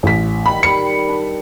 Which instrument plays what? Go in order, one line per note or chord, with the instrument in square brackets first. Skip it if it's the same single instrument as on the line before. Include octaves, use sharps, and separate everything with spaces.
[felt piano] A1 B6
[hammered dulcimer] D#3 G3 C#6 [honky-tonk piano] B5
[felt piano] C#7
[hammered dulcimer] D4